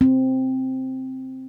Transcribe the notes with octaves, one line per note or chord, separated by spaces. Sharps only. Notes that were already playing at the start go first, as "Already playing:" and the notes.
C4